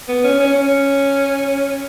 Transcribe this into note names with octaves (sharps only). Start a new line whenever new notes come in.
B3
C#4
C#4
C#4